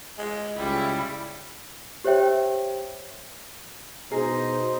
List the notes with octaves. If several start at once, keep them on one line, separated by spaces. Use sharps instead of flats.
G#3
C#2 C#3 G3 E4
G4 C5 C#5 E5 G5
B2 D#4 G#4 C5 A#5